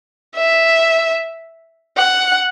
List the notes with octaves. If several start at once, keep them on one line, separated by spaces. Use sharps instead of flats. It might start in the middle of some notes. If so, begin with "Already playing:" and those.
E5
F#5